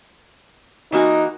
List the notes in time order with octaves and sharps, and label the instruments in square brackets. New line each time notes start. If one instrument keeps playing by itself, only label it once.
[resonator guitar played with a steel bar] E3 A#3 F#4 [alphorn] D#4